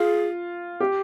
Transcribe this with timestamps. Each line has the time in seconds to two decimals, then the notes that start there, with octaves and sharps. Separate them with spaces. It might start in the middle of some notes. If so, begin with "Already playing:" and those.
Already playing: F4 G#4
0.80 G4